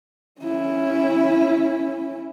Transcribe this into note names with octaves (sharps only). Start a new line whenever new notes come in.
C#4 E4